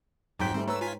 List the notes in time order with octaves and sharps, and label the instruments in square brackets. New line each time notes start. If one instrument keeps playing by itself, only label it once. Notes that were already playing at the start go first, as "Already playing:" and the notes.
[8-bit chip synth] F2 F#3 B6 [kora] G#2 G5
[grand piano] G3 A3 [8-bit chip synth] C4
[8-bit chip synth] A3 E6 [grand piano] B4 C#5 A#5
[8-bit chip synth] F4 G#5 B6